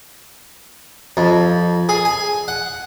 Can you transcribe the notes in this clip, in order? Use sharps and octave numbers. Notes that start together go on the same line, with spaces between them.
F2
G#4
G#5
F#5